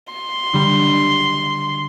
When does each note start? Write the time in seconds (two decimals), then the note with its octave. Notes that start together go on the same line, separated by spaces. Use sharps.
0.12 C6
0.53 D3 G3